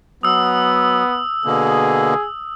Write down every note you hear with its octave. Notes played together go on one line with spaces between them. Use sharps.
F#3 B3 D#6 E6
B2 D3 A#3 G#4